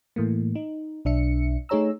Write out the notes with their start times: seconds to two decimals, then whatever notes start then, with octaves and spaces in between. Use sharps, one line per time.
0.16 A2 E3 A3 A#3
0.55 D#4
1.05 B1 D4 E5 C#7
1.69 A3 D#4 G#4 C#5 A#5 E6